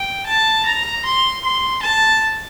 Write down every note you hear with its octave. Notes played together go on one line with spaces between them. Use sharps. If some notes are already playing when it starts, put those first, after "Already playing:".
Already playing: G5
A5
A#5
C6
C6
A5